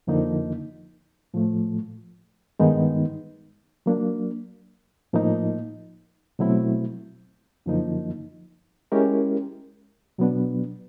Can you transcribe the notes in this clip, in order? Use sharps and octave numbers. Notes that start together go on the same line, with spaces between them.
F2 D3 F3 A#3 D#4
A2 F3 A3
G2 D#3 G#3 B3 D#4
F#3 A#3 D4
A2 F3 A#3 D#4
B2 F#3 A3 C4 E4
F#2 D3 F3 A#3 D#4
G#3 C#4 E4 G4 A#4
B2 F#3 B3 D4